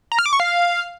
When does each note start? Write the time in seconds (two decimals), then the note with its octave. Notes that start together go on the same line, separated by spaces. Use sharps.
0.12 A#5
0.19 F6
0.26 D6
0.33 C#6
0.40 F5